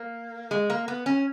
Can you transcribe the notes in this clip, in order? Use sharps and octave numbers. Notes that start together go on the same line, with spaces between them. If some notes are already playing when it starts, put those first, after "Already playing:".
Already playing: A#3
G#3
A#3
B3
C#4